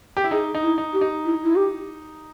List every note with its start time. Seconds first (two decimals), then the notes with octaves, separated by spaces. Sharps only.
0.17 G4
0.24 E4
0.31 D#4 G#4
0.55 D#4
0.62 E4
0.78 D#4
0.93 G4
1.01 D#4
1.25 E4
1.43 E4
1.56 G4